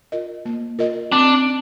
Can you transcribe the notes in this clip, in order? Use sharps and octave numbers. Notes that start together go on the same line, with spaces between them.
F4 A#4 D#5
A#3
F4 A#4 D#5
C4 D4